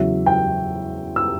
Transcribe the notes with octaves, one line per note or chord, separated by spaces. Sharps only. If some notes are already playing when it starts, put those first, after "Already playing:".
Already playing: E2 C#3 F#3 E5
G5
E6